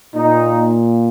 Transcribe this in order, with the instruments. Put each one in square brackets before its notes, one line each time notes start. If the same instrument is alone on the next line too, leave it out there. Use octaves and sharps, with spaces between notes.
[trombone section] A#2 A#3 D#4